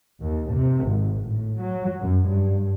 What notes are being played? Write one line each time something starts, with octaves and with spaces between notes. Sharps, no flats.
D#2
C3
G#1
A2
F#3
F#2
G2